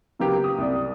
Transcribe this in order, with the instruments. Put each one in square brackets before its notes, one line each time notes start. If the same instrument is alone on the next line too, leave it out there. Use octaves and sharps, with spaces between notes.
[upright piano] C#3 F#3 A#3 B3 G4
D#6
C2 D5